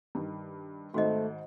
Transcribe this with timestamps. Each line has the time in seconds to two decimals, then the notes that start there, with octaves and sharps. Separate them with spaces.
0.15 G2 D#3
0.94 G#1 G#2 A3 F#4 C5 D#5